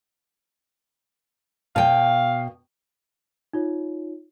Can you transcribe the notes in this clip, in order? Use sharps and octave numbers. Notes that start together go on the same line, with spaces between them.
B2 F5 G5
D#4 F4 C#5